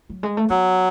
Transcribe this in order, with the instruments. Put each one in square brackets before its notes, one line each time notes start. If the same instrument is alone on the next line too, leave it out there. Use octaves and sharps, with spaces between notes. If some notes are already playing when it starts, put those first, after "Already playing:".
[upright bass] F#3
G#3
A3
[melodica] F#3 [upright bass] B3